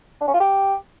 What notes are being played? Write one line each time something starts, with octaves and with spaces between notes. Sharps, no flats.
D4
C#4
F4
G4